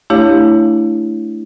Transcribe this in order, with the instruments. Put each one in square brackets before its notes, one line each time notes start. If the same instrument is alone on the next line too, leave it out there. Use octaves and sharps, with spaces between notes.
[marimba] A3 D4 E4 G4 C#5 F5